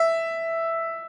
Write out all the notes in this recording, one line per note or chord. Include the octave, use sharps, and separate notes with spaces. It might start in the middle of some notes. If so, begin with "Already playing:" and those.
Already playing: E5